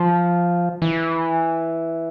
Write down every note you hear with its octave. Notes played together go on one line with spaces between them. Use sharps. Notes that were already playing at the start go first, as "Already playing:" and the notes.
Already playing: F3
E3